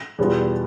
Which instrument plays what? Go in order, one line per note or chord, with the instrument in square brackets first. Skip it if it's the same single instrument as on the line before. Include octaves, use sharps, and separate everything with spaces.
[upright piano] E2 B2 G3 B3 F4